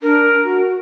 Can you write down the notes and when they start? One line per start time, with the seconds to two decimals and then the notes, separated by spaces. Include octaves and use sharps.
0.02 D4 A#4
0.44 F#4